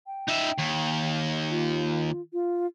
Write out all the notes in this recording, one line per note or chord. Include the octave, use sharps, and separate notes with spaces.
G5
D#4 E5
D#2
F4
F4